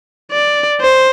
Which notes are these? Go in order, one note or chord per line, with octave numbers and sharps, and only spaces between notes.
D5
C5